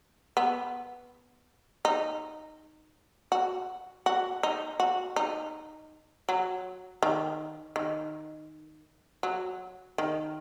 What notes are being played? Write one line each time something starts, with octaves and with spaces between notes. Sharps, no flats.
B3
D#4
F#4
F#4
D#4
F#4
D#4
F#3
D#3
D#3
F#3
D#3